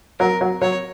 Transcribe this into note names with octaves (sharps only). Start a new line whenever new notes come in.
F#3 A#4
F#3
F#3 C#5